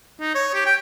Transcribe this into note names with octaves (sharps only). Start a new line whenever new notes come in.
D#4
C#5
G4
G5